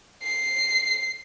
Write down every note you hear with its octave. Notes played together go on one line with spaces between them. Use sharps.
C7